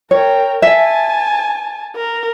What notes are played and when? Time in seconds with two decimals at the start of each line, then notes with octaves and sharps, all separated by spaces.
0.11 A#4 C#5 G5
0.62 E5 G#5 A5
1.96 A#4